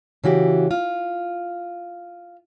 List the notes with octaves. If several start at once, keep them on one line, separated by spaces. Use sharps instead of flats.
C#3 E3 F#4 G4
F4